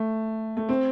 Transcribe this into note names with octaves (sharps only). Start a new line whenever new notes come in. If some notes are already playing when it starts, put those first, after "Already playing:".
Already playing: A3
A3
C4